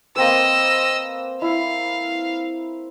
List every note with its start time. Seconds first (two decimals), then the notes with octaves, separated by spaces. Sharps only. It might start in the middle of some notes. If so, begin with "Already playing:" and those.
0.16 A#3 C4 B4 D#5 E6
1.42 E4 F5